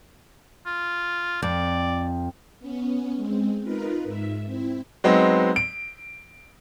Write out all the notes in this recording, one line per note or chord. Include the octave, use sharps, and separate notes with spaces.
F4
F2 D5
B3 C#4
G#3 C4
D#4 F4 A#4 B4
G#2 E5
C4 E4
F#3 G#3 B3 C4 D#4
D7